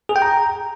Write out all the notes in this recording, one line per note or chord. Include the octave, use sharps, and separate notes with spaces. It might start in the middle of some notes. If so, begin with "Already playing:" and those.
G#4
G5
A#5